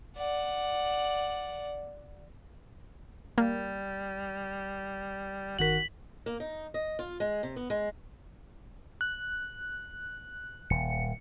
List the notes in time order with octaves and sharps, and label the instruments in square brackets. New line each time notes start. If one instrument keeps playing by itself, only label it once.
[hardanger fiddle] D5 F#5
[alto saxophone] G3 [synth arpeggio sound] A#3
[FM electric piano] G1 D#3 A#4 [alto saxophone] F#4 [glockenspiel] B6 F#7
[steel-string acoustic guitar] A#3
D#4
D#5
F4
G#3
C3
B3
G#3
[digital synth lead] F#6
[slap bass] D#1 [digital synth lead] C#7